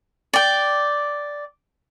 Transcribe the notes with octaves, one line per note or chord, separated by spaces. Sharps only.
D5 G5